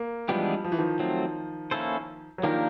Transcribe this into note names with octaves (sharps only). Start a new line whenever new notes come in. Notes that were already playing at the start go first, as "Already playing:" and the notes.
Already playing: A#3
E3 F3 G3 G#3 B3 D4 G4
F3
E3
D#3 F3
F#3 A3 C4
A#3 C#4 E4 A4 C5
F#3
D#3 F3 A#3 D4 G4 A#4